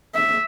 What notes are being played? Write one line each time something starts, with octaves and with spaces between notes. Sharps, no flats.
E5